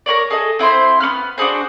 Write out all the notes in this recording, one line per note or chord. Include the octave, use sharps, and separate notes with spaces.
A#4 B4 C#5 D5
G#4 A4 D#5
C4 E4 C5 C6
B3 C#4 B5 F6
D4 F#4 G#4 C5